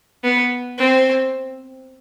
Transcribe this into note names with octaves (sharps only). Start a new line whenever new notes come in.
B3
C4